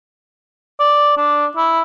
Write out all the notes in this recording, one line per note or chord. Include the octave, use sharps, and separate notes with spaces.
D5
D4
E4